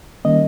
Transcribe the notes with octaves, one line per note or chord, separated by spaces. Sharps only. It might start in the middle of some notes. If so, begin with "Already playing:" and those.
D#3 G3 A#3 C#4 D#5